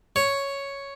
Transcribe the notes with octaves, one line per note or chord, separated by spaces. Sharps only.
C#5